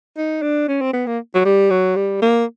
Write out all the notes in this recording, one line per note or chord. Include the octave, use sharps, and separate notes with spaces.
D#4
D4
C#4
C4
B3
A#3
F#3
G3
F#3
G3
A#3